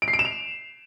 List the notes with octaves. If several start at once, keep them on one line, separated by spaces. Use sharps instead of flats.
D7
C7
D7
E7
F7